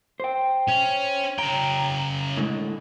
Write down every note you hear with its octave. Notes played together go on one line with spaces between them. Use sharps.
C5 G5
C#4
C#3 G5 A#5
A2 D3 G#3